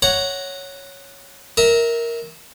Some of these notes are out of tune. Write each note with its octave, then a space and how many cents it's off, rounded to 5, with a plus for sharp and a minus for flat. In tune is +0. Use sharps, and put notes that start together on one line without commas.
C#5 +0 F#5 +0 A#5 +0
A#4 +0 E5 -25